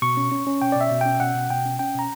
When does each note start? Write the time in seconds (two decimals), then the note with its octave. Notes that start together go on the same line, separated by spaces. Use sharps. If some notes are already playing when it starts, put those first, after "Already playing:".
0.02 B2 C#6
0.17 C#4
0.32 C#4
0.47 C#4
0.62 B2 G5
0.72 B2 D5
0.81 E5
0.91 B2
1.01 C#4 G5
1.20 B2 F#5
1.35 B2
1.50 B2 G5
1.65 C#4
1.79 C#4 G5
1.95 B2 A#5